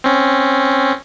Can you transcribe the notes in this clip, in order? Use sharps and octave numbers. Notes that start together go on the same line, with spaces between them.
C4 C#4